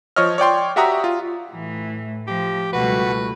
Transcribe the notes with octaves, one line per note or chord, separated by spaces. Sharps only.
F3 C#5 D#5 F6
C#5 D5 G5 C6
F#4 G4 E5 F#5 A#5 D#6
F4
A2 E3 A3
F3 G4
C#2 B2 G3 A3 F#4 B4